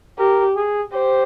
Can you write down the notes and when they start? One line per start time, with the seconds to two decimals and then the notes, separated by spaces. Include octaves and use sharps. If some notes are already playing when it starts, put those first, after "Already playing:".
0.18 G4 A#4
0.56 G#4
0.93 G4 C5